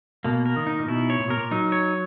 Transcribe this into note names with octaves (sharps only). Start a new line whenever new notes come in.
B2 A#3
A#4
D#3
D#4
A#2
B2 E4
C#5
A#2
B2 A#4
A#2
F#3 D#4
C#5